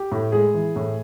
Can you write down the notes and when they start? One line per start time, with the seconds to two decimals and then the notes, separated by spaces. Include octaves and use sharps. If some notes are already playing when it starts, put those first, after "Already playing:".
Already playing: G4
0.12 A2
0.32 G#3 G#4
0.54 E3
0.76 A2